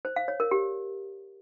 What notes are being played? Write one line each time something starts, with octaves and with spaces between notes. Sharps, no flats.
C5
F5
C#5
A#4
G4